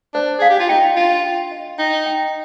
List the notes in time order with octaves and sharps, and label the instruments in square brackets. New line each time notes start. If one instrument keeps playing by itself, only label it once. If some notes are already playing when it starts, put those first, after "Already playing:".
[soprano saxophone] D4 [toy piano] C5
[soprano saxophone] G#4 [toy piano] F5
[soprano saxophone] G4
F4
[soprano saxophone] D#4 [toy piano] G5
[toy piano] D4 [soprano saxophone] F4
[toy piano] G5
D#5
[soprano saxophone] D#4 [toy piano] G5
[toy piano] G5